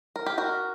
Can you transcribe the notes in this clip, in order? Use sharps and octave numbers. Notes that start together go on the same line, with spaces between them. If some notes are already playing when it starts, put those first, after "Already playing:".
A#4
G4
F#4 A#4